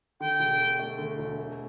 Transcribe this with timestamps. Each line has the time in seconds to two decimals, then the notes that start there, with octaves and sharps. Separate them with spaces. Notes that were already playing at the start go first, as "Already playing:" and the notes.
0.20 D3 G5
0.40 E1
0.59 D2
0.79 A3
0.98 D3
1.19 E1
1.38 A3